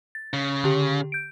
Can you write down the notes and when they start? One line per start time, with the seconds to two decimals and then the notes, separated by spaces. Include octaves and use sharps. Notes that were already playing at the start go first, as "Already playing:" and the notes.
0.15 A6
0.33 C#3
0.64 D3 G4
1.12 G6 D7